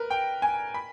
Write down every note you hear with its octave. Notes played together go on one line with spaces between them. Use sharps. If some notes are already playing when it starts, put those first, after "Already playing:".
Already playing: A#4 B4
G5
G#5
B5